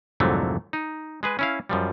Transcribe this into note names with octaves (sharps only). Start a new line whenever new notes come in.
C2 F2 G#2 D3 F#3 A3
D#4
G#3 G#4 B4
C#4 E4 F5
F#2 F3 G3